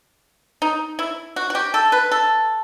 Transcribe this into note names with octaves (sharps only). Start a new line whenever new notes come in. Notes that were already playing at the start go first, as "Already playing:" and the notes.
D#4
E4
F#4
F#4
G4
A4
B4
A4